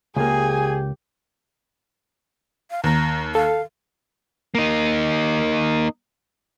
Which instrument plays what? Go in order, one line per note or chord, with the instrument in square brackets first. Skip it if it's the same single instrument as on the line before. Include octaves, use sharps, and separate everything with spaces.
[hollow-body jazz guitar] C#2 A#3 [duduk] G4 [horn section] G#4 [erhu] G#5
[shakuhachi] F5
[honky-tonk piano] D#2 [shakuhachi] A#5
[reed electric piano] A4 [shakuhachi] F5
[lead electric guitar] A#3 D#4